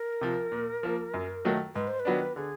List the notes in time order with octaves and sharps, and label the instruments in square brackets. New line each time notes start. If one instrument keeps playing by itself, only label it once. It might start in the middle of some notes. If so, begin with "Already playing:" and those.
Already playing: [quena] A#4
[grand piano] C3 F3
A#2
F3 A#3
F#2
D#3 F#3 A3
[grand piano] G#2 [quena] B4
[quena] C5
B4
[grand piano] D#3 F#3 B3 D4
[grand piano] D3 [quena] G#4